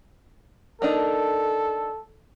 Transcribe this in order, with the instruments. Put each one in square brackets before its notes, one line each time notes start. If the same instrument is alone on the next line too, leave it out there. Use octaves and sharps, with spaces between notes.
[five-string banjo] A#3 D4 D#4 [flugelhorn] A4